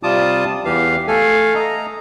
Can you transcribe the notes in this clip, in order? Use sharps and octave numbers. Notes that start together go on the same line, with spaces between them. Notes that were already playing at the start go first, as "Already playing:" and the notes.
C3 G3 F4 A5 D6 D#6
E2 E3 G4 F5
A3 A4 F5 G#5
D#5 A#5